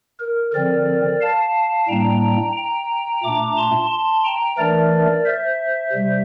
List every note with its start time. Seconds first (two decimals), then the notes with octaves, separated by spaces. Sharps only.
0.20 A#4
0.54 D3 F3 C4 A#4 D5
1.21 F5 A5
1.88 A2 G3 A#3 D4 G5 A#5
2.56 G5 A#5
3.23 A#2 A3 D4 A#5 D6
3.57 A5 C6
3.90 A5 C6
4.24 G5 A#5
4.58 E3 A3 D4 A#4 D5
5.25 C5 E5
5.93 C3 G3